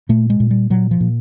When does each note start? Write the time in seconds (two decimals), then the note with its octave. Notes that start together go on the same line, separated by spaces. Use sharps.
0.09 A#2 A3
0.30 G#3
0.40 A#2
0.51 G3
0.70 A#2 F#3
0.91 F3
1.00 A#2